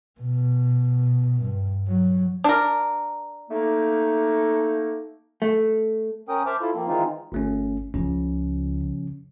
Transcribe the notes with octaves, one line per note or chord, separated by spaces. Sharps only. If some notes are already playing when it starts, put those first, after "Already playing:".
B2
G2
F#3
D4 A#4
A3 A#3 D#4
A3
C#4 A#4 G5 D#6
C5 E5 A5 D6 F6
E4 F4 A4
F3 A#3 C4
D#3 E3 G#3 C4 D#4 F4
G1 A3 C#4
C#2 C#3 F3 C#4